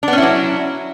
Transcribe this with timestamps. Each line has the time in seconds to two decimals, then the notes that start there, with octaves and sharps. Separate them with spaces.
0.03 D4
0.08 B3
0.13 C#4
0.18 E4
0.23 F#3